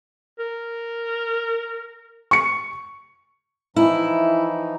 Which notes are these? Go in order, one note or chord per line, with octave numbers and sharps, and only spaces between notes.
A#4
C#6 C#7
E3 F3 D#4 E4